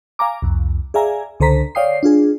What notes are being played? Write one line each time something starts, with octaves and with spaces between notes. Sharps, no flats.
F5 G#5 A#5 D6
C2 F2
G#4 D5 E5 F5 G#5 A#5
C#2 D3 A4 C5 A#5 B6
C#5 D5 F5 G5 D#6 C7
D4 F4 G#4